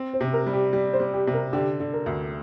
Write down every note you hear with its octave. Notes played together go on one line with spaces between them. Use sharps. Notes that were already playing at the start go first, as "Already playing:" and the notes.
Already playing: C4
C5
C3
A#4
G3
G4
G3 G4
C5
G3
G4
C3
A#4
D3 G4
D3
A#4
D2